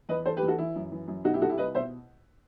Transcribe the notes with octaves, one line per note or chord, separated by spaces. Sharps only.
E2 B4 D#5
E2 A4 C5
G4 B4
E2
F#4 A4
E3 E4
F#2
E3
F#2
B2 D#4 F#4
E4 G4
C2 F#4 A4
E4 G4
C2 B4 D#5
B2 C5 E5